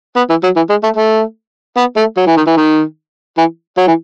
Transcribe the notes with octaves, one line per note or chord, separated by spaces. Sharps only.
B3
E3
F#3
E3
G#3
A3
A3
B3
A3
F#3
E3
D#3
E3
D#3
E3
F#3
E3